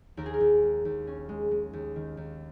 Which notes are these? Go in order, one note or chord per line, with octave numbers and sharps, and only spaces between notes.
D#2 A#4
G#4
A#4
D#2
G#3
D#2
C#4
G#3
G#3
D#2
D#3
D#2